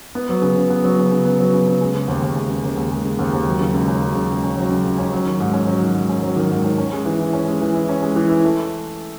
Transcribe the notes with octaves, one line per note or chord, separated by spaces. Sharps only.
B3
F#3
C#3
C#3
B3
F#3
C#3
C#3
B3
F#3
C#3
C#3
G#3
C#3
D#2
D#2
G#3
C#3
D#2
D#2
G#3
C#3
D#2
D#2
F#3
C#3
C#2
C#4
F#3
C#3
C#2
C#4
F#3
C#3
C#2
C#4
F#3
D#3
G#2
C#4
F#3
D#3
G#2
C#4
F#3
D#3
G#2
C#4
C#4
G#3
E3
E4
C#4
G#3
E3
E4
C#4
G#3
E3
E4
A3